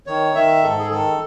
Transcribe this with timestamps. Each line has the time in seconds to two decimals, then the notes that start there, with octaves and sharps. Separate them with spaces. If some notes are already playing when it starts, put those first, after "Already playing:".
0.07 D#3 C#5
0.35 D#3 E5
0.63 G#2 A4
0.79 G#4
0.91 D#3 A4